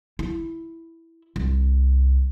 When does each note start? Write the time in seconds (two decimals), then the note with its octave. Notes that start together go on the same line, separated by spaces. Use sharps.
0.19 E4
1.36 C2